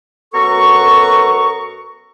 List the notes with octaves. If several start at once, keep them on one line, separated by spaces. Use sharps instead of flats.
F#2 B3 F#4 A4 A#5 C#6